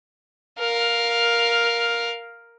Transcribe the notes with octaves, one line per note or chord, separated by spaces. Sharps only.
A#4 F5